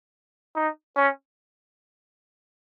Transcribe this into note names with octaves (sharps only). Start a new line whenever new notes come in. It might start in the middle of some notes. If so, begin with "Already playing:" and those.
D#4
C#4